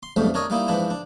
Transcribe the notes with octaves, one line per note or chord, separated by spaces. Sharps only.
C6
B1 F2 G#2 G3 A3
D4 A#4 C#5 D#5
G3 A#3 D#4 E4
G#2 E3 F3 D4 E4
D4